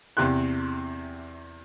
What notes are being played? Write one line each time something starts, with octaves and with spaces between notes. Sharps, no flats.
E2 C3 G4 C6 F#6